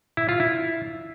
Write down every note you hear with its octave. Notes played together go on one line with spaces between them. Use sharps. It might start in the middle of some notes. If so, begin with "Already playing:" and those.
E4
F4
E4